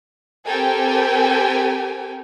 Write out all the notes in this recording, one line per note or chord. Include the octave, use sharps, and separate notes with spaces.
C4 G4 A4 A#4 G5 G#5